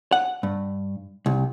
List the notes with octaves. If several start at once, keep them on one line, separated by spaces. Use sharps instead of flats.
F#5
G2
C2